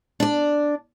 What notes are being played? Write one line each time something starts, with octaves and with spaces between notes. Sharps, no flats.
D4 D5